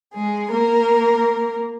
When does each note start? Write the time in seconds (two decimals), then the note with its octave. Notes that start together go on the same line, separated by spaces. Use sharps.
0.14 G#3 G#4
0.52 A#3 A#4